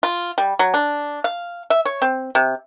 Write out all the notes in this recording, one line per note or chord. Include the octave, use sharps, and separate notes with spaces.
F4
G3
F#3
D4
F5
E5
C#5
C4
C3